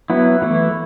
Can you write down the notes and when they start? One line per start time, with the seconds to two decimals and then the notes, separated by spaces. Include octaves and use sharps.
0.10 F#3 B3 E4
0.42 E3 A3 E4